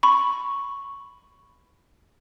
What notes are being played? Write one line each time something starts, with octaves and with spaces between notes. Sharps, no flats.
B5 C#6